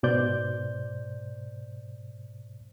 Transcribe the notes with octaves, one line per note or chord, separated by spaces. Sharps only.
G#2 B2 C5 D5 G6